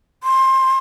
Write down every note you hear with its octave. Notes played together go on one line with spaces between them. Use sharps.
C6